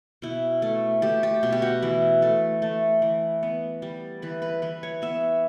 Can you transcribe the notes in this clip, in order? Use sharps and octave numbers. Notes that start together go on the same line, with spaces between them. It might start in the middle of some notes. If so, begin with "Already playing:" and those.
B2 E4
A3
A3 G4
G4
B2
G4
F#4
E3 E4
A3
A3
E3
B3
G3
E3 B4
B4
E3 B4
C#5
B3 E5